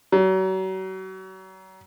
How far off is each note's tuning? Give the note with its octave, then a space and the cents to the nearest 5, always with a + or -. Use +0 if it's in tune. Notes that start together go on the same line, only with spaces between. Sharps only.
F#3 +35